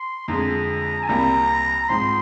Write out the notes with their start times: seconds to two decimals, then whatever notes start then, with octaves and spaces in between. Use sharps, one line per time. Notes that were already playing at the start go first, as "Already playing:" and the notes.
Already playing: C6
0.28 F2 D3 G#3 A#5
1.03 G#5
1.08 C2 C3 G3 A#3 A#5
1.89 G#2 F3 C4 C6